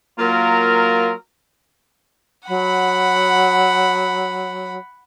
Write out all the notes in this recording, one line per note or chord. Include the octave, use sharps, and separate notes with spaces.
F#3 A#3 F4 A#4
F#3 F#5 B5